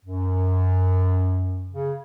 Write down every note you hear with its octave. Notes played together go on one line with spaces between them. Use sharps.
F#2
C#3